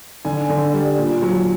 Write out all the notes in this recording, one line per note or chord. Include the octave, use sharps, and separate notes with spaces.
D3 G#5
D3
G3
A#2
F#3